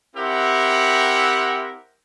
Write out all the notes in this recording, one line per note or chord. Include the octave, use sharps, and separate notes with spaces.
C4 E4 G4 A#4 E5 F#5